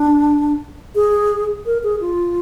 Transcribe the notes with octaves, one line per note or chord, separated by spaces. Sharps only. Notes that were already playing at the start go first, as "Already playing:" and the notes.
Already playing: D4
G#4
A#4
G#4
F4